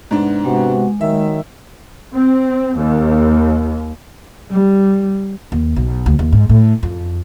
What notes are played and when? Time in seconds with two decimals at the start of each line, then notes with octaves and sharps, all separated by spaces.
0.11 G#2 C3 B3 D4
0.45 C3 G#3 B3 F#4
1.01 D#2 D#3 F#3 E5
2.13 C4
2.76 D#2
4.51 G3
5.52 D#2
5.76 B1
6.06 D2
6.19 D#2
6.33 G#2
6.49 A2
6.83 F2